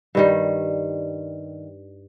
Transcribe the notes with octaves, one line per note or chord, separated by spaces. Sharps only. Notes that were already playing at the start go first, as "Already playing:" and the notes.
G2 D#3 G3